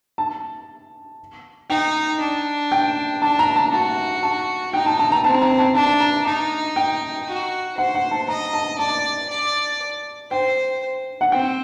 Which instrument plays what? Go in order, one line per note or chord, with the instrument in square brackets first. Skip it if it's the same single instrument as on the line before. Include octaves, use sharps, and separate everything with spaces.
[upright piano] A5
[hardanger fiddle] D#4 [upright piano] G5
[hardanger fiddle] D4
[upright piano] G5
[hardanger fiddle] D4 [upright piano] A5
[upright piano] A#5
A5
[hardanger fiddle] F#4 [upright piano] A5
[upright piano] A5
[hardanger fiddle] D#4 [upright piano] G5
[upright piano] A5
A5
A#5
[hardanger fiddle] C4 [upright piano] A5
[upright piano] A#5
A5
[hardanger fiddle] D4 [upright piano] A5
[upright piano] A#5
[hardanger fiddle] D#4 [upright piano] A5
[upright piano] G5
[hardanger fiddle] F#4
[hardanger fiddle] C5 [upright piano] F#5
[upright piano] F#5
A5
[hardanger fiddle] D#5 [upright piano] A#5
[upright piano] A5
[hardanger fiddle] D5 [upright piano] A5
[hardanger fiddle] D5
[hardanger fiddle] C5 [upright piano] G5
[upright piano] F#5
[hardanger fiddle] C4 [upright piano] G5